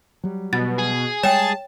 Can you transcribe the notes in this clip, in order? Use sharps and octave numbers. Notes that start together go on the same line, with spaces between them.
F#3 G3
B2 A6
G#4
G3 G#3 C#5 G5 A5